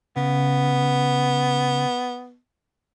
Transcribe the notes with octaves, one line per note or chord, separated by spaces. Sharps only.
C#3 B3